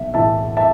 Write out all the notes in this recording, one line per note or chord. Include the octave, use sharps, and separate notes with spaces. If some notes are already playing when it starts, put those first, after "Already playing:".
Already playing: B1 E5
A2 E3 E5 A5
E5 A5